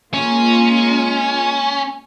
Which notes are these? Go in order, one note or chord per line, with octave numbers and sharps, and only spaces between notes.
G#3 A#3 C#4 F4